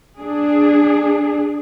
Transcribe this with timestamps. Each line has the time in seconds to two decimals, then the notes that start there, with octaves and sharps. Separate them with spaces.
0.19 D4 G#4